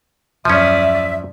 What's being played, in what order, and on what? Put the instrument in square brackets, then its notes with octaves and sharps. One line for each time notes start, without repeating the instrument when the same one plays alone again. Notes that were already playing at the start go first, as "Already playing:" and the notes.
[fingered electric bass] D#1 F#2 [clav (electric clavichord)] F3 C#4 [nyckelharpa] D5 D#6 [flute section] E5